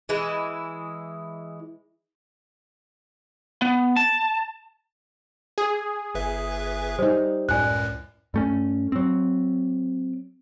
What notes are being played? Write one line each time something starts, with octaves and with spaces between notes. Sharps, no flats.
E3 G#3 E4
B3
A5
G#4
G1 B4 E5
G3 D#4 C5
C#2 F#2 A2 D5 G#5 F#6
G2 A3 C#4
F#3 C4